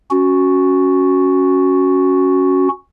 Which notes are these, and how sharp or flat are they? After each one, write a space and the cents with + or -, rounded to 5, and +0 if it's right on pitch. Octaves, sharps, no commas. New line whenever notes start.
C#4 +0 F#4 +0